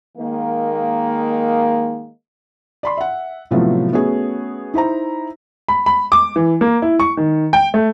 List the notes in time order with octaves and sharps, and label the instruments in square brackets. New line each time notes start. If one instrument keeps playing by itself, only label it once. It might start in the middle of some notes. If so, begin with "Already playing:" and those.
[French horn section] D#3 G#3 A#3
[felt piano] D5 B5 C6
E5 F#5
A2 C3 F3 F#3 A3 B3
A3 B3 C#4 F#4 G#4
D#4 E4 C5 A#5
[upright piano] B5
B5
D6
E3
A#3
E4
C#6
D#3
G5
A3